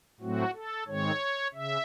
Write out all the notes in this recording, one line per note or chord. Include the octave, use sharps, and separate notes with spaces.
A2 F#3 A3 C4 F#4
A4
G#2 D#3 G#3 C4 C#5
C#3 E5